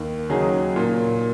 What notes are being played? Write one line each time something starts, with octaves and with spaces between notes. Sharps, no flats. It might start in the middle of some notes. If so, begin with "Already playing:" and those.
Already playing: D#2
C#3 F#3 D#4 G#4
A#2